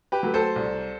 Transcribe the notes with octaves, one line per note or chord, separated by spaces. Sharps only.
G4 B4
F#3 A3
A4 C5
C2